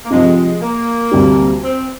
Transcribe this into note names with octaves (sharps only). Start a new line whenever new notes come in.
A#3
C3 F3 G#3 C4
G#3
A#3
D2 C3 G3
C4